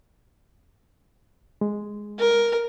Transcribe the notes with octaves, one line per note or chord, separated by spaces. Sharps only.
G#3
A#4